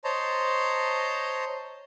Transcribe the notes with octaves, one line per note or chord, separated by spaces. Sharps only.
C5 C#5 D#5 A5 A#5 C6